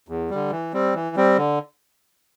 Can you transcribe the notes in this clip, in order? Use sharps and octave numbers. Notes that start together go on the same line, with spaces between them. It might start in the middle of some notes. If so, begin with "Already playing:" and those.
E2
D3 G3
E3
G3 C4
E3
G3 C4
D3